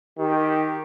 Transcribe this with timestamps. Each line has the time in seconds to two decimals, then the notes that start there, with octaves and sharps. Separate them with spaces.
0.18 D#3 G4